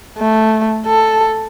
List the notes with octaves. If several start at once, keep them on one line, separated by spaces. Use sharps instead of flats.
A3
A4